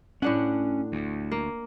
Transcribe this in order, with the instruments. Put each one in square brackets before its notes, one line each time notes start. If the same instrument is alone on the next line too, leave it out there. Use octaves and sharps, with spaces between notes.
[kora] A2 D4 F#5 [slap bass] C#4
[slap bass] D2
[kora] A#3